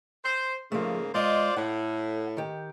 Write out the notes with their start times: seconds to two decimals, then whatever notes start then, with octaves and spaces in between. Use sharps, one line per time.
0.24 C5
0.72 G#2 C#3 F3 A3 A#3
1.14 G#3 F4 C5 D5 D#5
1.56 A2 F#5
2.37 D#3 G4